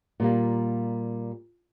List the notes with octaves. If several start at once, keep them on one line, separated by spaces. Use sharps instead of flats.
A#2 G3 A#3